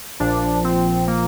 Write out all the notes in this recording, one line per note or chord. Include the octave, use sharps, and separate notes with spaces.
A#1 A#2 F3 D4
C4
A#3